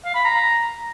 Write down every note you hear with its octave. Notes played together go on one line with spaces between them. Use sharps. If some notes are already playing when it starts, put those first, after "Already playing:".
F5
B5
A#5